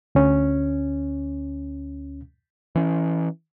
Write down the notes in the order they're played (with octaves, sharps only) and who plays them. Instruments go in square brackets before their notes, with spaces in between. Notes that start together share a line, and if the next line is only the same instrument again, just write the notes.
[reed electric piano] D2 C#4
[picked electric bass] E3 C#4